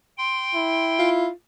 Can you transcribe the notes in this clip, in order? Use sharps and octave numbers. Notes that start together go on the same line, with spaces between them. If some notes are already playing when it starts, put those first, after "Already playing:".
G5 C6
E4
F4